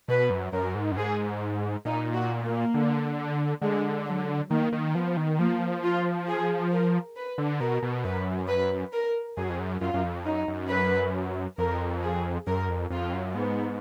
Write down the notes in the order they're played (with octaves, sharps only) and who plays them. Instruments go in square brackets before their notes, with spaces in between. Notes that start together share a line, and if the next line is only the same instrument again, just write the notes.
[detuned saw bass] B2 [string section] B4
[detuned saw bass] F#2
[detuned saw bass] F#2 [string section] A#4
[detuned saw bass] G#2
F#2
[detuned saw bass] G#2 [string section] G#4
[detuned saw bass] A#2 [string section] D#4
[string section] F#4
A#3
[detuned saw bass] D3
[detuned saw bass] D3 [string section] G#3
[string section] F#3
[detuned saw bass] D#3 [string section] A#3
[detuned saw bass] D#3
[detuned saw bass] F3 [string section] B3
[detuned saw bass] D#3
[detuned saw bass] F3 [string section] A#3
[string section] F4
G#4
A#4
B4
[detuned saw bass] D3
[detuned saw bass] B2 [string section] A#4
[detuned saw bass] B2
[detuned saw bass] F#2 [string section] B4
[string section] B4
A#4
[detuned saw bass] F#2 [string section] G#4
[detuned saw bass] F2
F#2
[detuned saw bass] F#2 [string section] F4
[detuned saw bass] F#2
F2
[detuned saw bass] F#2 [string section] D#4
[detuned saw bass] F#2
[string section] B4
[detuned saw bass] F2 [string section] A#4
[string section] G#4
[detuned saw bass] F#2 [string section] A#4
[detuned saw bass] F2
[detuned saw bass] F2 [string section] F4
[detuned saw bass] F#2
[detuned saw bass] G#2 [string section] B3